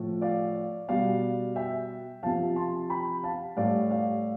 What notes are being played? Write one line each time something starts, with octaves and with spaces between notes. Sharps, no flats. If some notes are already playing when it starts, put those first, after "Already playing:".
Already playing: A2 F3
D5 F5
B2 G3 D5 F5
E5 G5
C3 F3 F5 A5
A5 C6
G5 B5
F5 A5
A2 G3 D5 F5
D5 F5